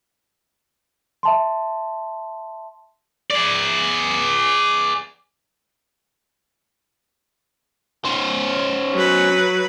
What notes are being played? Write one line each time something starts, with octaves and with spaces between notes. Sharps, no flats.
E5 A5 C6
G#4 D5
C#4 C5
F#3 B4